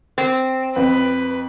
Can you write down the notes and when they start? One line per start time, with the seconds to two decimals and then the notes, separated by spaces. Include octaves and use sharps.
0.18 C4
0.76 F2 B4